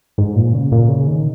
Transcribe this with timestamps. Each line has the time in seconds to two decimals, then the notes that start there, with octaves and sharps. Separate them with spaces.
0.18 G#2
0.36 A#2
0.53 C#3
0.72 A#2
0.89 C#3
1.07 D#3